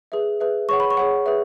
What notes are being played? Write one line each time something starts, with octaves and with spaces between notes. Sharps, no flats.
G#4 B4 E5
G#4 B4 E5
G#4 C#5 F#5 C#6
B5
C#6
G#4 C#5 F#5
G#4 B4 E5